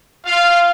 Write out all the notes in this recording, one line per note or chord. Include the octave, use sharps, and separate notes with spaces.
F4 F5